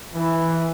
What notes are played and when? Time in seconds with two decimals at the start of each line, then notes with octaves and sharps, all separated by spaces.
0.14 E3